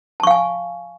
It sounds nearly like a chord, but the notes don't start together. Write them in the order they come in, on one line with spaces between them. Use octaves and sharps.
A5 C#6 F5 G#5